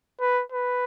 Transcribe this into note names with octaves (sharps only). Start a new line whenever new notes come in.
B4
B4